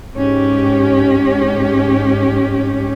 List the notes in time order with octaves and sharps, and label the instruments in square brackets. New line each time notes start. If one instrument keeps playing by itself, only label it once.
[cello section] G#2 C#4 G4